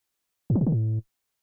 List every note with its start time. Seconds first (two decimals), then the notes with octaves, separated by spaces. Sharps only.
0.50 G#2
0.55 E3
0.61 A#2
0.67 D3
0.72 A2